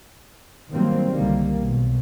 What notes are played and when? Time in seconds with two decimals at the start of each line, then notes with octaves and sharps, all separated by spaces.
0.72 D#3 F#3 G3 A#3 C4
1.09 C2 D3 D#3 G3 A#3
1.61 B1 B2